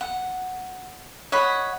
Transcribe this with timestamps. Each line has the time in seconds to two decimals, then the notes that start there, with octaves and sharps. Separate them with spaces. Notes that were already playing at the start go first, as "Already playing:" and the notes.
0.01 F#5
1.32 C#5 D#5 F#5 B5